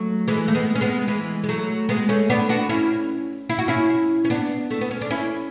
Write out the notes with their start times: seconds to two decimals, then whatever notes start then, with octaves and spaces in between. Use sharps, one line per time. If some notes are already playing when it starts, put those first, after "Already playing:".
Already playing: F#3 A3
0.28 E3 G#3
0.48 A3
0.55 G#3 B3
0.75 C#4
0.81 G#3 B3
1.08 E3 G#3
1.44 G#3
1.48 F#3 A3
1.89 G#3 B3
2.09 A3 C#4
2.30 B3 D4
2.49 D4 F#4
2.69 C#4 E4
3.49 E4
3.59 F#4
3.68 C#4 E4
4.25 C#4
4.30 B3 D4
4.70 A3
4.81 B3
4.91 C#4
5.01 D4
5.10 C#4 E4